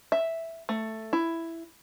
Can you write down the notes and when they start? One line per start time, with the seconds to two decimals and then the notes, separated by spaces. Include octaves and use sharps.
0.12 E5
0.69 A3
1.13 E4